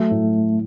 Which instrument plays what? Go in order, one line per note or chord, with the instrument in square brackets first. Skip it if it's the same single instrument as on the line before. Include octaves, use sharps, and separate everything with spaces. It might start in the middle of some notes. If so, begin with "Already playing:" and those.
Already playing: [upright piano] F#3 [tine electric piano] A3
[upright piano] A2